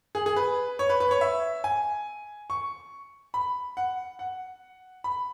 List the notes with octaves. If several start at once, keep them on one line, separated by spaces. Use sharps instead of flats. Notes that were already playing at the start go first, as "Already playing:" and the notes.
G#4
G#4
B4
C#5
B4
B4
C#5
E5
G#5
C#6
B5
F#5
F#5
B5